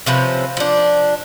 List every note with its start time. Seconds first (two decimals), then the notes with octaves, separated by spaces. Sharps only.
0.06 C3 F3 C#4 B4
0.57 F3 D4